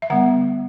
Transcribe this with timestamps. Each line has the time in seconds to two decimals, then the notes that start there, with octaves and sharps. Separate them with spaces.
0.02 E5
0.10 D3 G3 B3 F#5